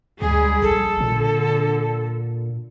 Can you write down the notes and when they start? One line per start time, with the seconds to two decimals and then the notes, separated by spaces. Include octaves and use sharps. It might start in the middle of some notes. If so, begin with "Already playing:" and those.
0.22 D2 G3 G#3 G#4
0.62 A#1 A4
1.01 A#2 D3